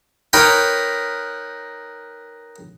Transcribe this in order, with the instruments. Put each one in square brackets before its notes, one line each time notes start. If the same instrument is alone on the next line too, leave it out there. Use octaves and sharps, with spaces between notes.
[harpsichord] D#4 A#4 B4 C#5 G5 B5